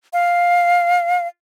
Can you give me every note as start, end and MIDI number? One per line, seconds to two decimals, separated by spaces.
0.13 1.27 77